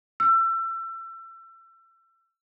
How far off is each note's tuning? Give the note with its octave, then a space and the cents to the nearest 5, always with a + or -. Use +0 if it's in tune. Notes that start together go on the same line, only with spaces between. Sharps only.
E6 +30